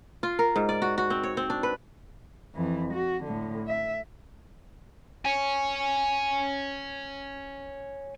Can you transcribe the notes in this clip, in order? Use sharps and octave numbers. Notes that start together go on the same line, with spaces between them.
F4
A#4
G#2
D5
F#4
F#4
C4
C#5
C4
D4
B4
F2 E3
F#4
A2 D3
E5
C#5 G#5